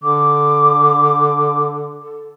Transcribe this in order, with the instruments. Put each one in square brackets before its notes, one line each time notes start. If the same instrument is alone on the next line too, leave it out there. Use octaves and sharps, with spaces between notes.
[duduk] D3 [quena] D6
[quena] A4